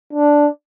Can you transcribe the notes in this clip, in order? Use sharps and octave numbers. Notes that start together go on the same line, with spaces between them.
D4